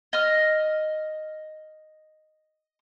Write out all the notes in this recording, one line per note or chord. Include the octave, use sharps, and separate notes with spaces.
D#5 F6